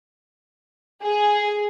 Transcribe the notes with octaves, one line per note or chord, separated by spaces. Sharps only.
G#4